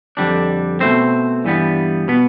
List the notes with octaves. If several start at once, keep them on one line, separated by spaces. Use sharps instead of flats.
F2 D3 G3 D4
B2 A3 C4 C5
G2 E3 G3 B3
B2 B3